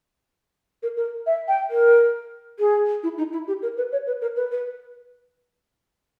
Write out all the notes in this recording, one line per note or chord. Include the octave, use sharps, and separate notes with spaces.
A#4
A#4
E5
G5
A#4
G#4
E4
D#4
E4
G4
A#4
B4
C#5
B4
A#4
B4
B4